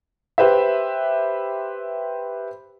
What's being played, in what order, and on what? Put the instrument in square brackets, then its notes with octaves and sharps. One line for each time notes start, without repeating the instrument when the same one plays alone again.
[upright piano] G4 B4 C5 E5